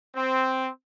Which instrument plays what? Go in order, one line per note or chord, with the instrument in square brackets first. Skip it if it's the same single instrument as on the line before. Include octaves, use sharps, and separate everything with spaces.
[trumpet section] C4